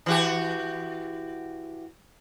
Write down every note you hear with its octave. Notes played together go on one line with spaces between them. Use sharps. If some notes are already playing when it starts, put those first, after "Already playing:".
E3 F#4 G4